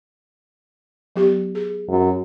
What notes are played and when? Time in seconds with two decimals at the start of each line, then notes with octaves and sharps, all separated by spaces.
1.16 F#3 B3 G4
1.55 G#4
1.89 F#2